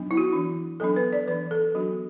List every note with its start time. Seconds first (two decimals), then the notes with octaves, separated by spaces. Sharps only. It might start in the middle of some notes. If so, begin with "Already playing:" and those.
Already playing: F#3 B3 D4
0.11 E4
0.17 F#4
0.33 E3 D4
0.80 F#3 B3 D4 A4
0.96 B4
1.13 D5
1.27 E3 D4 B4
1.51 A4
1.75 F#3 B3 D4 F#4